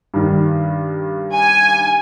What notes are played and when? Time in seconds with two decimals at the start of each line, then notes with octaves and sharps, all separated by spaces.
0.14 G2 D#3
1.32 G#5